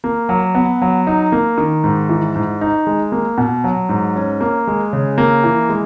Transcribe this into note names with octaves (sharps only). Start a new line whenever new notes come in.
A#3
F#3
B3
F#3
D#4
A#3
D#3
G#2
E3
G#2
D#4
G#3
A#3
B2
F#3
G#2
C#4
A#3
G#3
C#3
A#3
E3
G#3